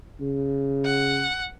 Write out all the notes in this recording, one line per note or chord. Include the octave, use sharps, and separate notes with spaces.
C#3
F#5